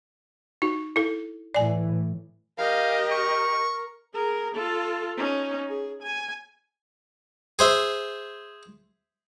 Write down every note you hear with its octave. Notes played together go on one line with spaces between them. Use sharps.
D#4 F#4
E4 A4
A2 E3 D5 G#5
G4 A#4 D#5 F5
C#6
G#4 A#4
F4 A4
C#4 D#4
G#4
G#5
G#4 C5 E5